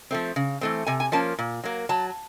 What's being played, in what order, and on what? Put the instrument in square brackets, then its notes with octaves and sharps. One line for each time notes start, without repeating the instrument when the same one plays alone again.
[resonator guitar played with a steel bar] F3 A3 C4
C#3
E3 A3 C4
C3 G#5
G#5
F3 A#3 C#4 A5
A#2
F#3 A#3
F#3 A5